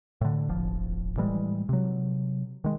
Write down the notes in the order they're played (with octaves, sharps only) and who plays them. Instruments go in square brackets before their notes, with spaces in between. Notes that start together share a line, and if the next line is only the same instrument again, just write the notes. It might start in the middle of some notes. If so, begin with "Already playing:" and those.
[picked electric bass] A2 D3
D1 G1 F3
A2 E3 G3 G#3
C3 F#3
D#3 G#3